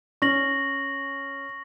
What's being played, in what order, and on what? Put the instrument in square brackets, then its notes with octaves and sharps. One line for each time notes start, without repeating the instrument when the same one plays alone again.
[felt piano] C#4 [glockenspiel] C#6 A#6 F#7